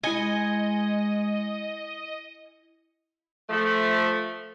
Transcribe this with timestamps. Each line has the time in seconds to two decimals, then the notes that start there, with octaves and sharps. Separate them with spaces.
0.04 G#3 E4 D#5 G#5 C#7 G7
3.49 F3 A3